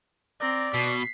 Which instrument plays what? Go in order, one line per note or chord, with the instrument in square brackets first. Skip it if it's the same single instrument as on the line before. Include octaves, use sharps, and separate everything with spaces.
[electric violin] C4 A#5 [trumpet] D5
[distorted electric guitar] B2 [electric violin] B6 C7